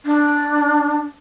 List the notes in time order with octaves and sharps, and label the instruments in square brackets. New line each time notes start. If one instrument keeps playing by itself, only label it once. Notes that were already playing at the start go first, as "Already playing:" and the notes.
[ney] D4